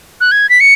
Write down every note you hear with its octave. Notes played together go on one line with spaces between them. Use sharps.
F#6
G#6
B6
C#7